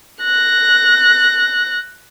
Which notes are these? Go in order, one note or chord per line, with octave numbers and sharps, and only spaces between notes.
F#6 A#6